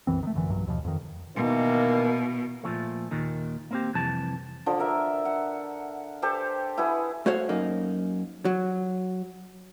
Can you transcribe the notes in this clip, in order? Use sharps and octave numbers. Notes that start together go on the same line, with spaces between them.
C2 F#2 E3 C4
D#3 A3
G#1 F#2 D3 E3
B1 G2 F#3
D#2 B2 F3
F2 D#3
B2 D#3 E3 A#3
A#2 C#3 F3 A3
D#2 A#2 D#3
A#3 C4 G4
C2 F2 E3 A5
D3 F3
A#4 E5
F#5
G4 A4 C5 A5
E4 G#4 B4 F#5
A3 F#4 C5 C#5 F5
F#2 A#3 D#4
F#3